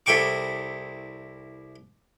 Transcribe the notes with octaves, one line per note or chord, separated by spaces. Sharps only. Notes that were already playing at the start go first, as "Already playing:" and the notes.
C2 E4 A4 G5 C#6 D6